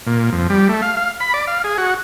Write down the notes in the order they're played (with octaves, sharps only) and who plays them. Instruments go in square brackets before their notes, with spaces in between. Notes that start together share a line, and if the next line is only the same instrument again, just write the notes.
[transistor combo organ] A#2
F2
G3
A3
F5
F5
B5
D5
F5
G#4
F#4